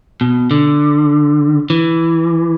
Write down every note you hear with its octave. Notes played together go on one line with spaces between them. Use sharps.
B2
D3
E3